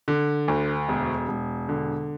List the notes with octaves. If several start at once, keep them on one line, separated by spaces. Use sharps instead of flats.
D3
D2
E1
E1
D3